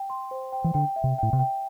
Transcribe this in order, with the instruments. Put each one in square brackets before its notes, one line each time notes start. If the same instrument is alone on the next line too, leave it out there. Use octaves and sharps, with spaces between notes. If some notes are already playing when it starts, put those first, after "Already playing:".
Already playing: [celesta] G5
C6
C5
G5
[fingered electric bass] E3
[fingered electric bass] D3 [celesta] G5
[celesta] E5
[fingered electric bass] C3
[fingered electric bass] A2 [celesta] G5
[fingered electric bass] C3
[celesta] G5